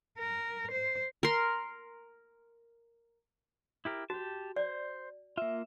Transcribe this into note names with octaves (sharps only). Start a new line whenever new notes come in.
A#4
C5
A#4 C6
E4 G4 A#4
F#4 G4 A5
C5 D5
A#3 F4 E5